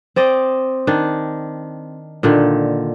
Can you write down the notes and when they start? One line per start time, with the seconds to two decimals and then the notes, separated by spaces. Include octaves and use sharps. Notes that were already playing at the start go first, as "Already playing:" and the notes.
0.16 C4 D5 D#5
0.87 D#3 D4
2.23 A#2 D3 D#3